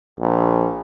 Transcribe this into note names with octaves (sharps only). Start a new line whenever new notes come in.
A#1